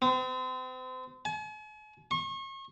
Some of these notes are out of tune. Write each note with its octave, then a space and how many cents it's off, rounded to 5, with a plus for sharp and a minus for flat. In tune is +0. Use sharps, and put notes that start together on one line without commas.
C4 -35
G#5 +45
C#6 -35